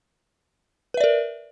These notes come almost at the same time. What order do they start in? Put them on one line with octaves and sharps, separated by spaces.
B4 E5 D5 A#4